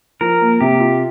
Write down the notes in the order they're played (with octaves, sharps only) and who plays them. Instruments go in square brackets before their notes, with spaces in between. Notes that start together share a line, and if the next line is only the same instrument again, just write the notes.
[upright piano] F3 [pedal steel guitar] A#4
[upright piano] A#3
[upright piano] C3 [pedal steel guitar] G4
[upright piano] F4